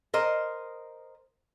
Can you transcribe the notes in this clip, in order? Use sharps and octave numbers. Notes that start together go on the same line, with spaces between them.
A#4 C5 D#5